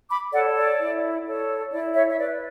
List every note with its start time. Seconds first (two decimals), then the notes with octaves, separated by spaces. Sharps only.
0.11 B5 D6
0.33 A4 C#5 D5 F#5
0.56 D5
0.80 E4
1.26 A4 C#5
1.71 E4 D5
1.95 C#5 E5
2.10 E5
2.18 B4 D5